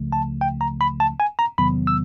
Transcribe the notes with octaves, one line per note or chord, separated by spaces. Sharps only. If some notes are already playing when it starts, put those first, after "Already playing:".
Already playing: C#2 C#3 F3 A3
A5
G5
A#5
B5
A5
G#5
A#5
E2 C3 D#3 F#3 B3 B5
E6